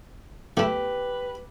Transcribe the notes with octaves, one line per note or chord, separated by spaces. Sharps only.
A3 E4 G4 B4